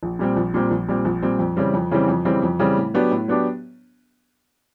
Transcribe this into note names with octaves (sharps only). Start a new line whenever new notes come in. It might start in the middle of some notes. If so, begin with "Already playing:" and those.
A#1
A#2 G3 C4
A#1
A#2 G3 C4
A#1
A#2 G3 C4
A#1
A#2 G3 C4
F2
C#3 E3 G3 C4
F2
C#3 E3 G3 C4
F2
C#3 E3 G3 C4
F2
C#3 E3 G3 C4
A2
F#3 B3 D4 G4
A2
F#3 B3 D4 G4